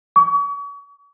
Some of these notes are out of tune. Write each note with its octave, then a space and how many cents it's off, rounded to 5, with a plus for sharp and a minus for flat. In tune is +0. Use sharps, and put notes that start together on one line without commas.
C#6 +40